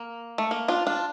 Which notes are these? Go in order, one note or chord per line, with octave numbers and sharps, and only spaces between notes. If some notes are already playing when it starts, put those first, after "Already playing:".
Already playing: A#3
A3
A#3
D4 F4
D4 F4